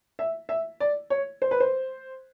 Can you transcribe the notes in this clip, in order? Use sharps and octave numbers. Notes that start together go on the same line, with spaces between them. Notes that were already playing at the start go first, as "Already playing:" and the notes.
E5
E5
D5
C#5
C5
B4
C5